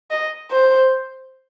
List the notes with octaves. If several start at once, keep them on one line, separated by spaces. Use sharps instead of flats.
D#5
C5